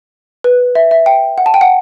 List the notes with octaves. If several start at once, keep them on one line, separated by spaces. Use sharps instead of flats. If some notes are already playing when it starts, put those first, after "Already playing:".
B4
E5
E5
G5
F#5
A5
G5
F#5